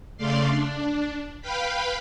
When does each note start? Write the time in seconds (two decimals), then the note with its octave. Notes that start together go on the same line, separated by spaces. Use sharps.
0.18 C#3 A3 D5 F5 C6
0.48 D4
1.42 B4 F5 G5 B5